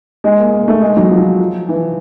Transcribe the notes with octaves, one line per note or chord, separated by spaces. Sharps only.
G#3
A#3
A#3
A3
G#3
F#3
F3
E3